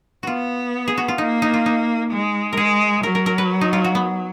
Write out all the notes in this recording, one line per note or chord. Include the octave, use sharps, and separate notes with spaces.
B3 F4 F#4
G#4
F#4
F4
A#3 D#4
D#4
F4
D#4
G#3
G#3 G#4 A#4
F#3 A#4
A#4
A#4
B4
D#4
F4
F#4
B3